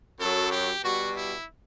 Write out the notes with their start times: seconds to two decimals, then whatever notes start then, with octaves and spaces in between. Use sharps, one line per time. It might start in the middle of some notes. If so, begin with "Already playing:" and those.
0.20 F#2 F#3 A4
0.52 G4
0.84 B2 G3 F#4
1.17 E4